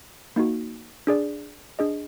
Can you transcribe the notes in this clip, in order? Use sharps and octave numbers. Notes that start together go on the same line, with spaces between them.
A#3 D#4 F#4
D4 G#4 D5
D4 G#4 D#5